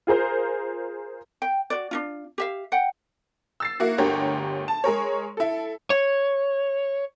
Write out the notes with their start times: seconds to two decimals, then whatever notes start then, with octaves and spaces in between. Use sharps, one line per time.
0.07 F4 G#4 A#4 C5
1.42 G5
1.70 F#4 D5
1.91 D4 D#4 F4
2.38 G4 E5 F5
2.72 F#5 G5
3.60 E6 A6 C7
3.80 A#3 E4 F#4
3.98 G1 D2 G4 A#4 C#5 G5
4.68 A5
4.84 G#3 G#4 A#4 C#5
5.37 E4 A4
5.90 C#5